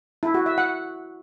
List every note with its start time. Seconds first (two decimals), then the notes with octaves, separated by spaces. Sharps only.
0.23 E4
0.34 F#4
0.46 E5
0.58 F#5